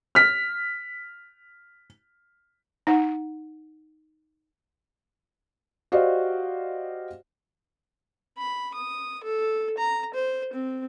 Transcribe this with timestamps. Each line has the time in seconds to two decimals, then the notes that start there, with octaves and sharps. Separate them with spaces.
0.15 F6 B6
2.87 D#4 F#5
5.92 F#4 G4 C5 D5 D#5 F5
8.38 B5
8.74 D#6
9.23 A4
9.78 A#5
10.14 C5
10.53 C4